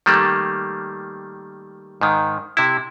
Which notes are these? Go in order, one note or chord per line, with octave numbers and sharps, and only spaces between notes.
D#3 G3 A3 A#3
G#2 D#3
C3 E4